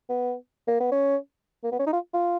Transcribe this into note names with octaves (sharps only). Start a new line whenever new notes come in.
B3
A#3
B3
C#4
A#3
B3
C#4
D#4
F4
F4